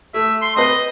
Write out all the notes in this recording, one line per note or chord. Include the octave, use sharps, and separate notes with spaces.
A3 E5
C6
C4 B4 D#5